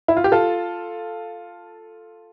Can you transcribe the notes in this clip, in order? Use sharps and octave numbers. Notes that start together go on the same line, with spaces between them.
E4
F4
G4
F4 A4